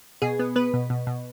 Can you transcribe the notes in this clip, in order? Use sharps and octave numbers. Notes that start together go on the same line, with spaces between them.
B2 G#4
B3
B3 B4
B2
B2
B2